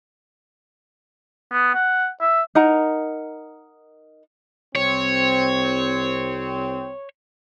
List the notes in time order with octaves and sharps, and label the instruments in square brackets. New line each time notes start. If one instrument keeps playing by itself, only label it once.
[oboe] B3
F#5
E5
[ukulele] D#4 A#4 F#5 A#5
[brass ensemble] C2 C4 [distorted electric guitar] C#5